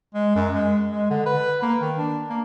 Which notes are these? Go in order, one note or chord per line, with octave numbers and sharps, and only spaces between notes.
G#3
F#2
G#3
G#3
D3
B4
A#3
D#3
D4
A#3